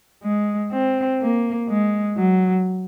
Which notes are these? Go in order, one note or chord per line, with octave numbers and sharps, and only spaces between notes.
G#3
C4
A#3
G#3
F#3